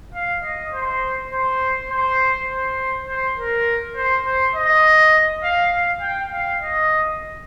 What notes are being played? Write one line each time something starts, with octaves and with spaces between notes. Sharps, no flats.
F5
D#5
C5
C5
C5
C5
C5
A#4
C5
C5
D#5
F5
F5
G5
F5
D#5